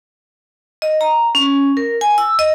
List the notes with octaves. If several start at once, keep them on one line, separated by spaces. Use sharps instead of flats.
D#5
A#5
C#4
A#4
G#5
E6
D#5